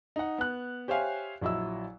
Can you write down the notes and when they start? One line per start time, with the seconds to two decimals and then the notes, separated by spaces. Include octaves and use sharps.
0.16 D#4 F#5
0.38 B3 F#6
0.88 G4 C5 C#5 E5 F5 G#5
1.41 A#1 F#3 E4 D#5 E6